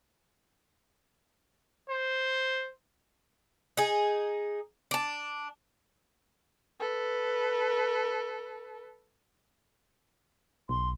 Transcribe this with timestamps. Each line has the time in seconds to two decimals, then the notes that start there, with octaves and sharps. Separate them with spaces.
1.90 C5
3.77 D#4 G#4
4.91 D4 A5
6.80 A4 B4
10.69 B1 C6